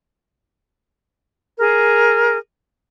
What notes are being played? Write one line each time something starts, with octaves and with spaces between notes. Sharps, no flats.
G#4 A#4